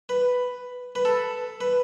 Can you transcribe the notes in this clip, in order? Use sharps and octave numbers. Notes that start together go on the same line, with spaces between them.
B4
B4
A4
B4